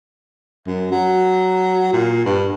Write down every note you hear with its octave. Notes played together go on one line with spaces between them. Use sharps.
F#2
F#3
A#2
G2